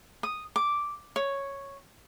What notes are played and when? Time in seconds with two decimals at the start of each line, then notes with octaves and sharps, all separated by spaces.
0.23 D#6
0.56 D6
1.16 C#5